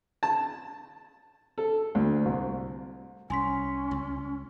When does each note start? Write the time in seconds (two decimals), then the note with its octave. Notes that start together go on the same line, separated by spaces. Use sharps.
0.23 A5
1.58 A4
1.95 D2
2.25 C2
3.30 C2 C#4 G#5 C6 B6
3.91 C#2